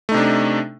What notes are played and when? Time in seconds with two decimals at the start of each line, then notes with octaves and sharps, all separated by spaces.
0.09 A3
0.12 D#4
0.14 C3
0.17 D4